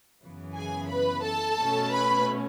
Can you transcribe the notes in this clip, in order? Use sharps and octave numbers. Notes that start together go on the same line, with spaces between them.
F#2 C#3 E3 B3
G#4 G#5
B4 B5
A4 A5
B2 A3 C#4
B4 B5